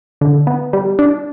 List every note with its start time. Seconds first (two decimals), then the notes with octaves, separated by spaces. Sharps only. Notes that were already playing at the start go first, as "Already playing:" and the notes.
0.21 D3
0.47 B3
0.73 G3
0.99 D4